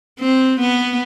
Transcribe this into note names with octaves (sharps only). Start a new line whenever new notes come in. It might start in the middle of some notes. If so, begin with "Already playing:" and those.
C4
B3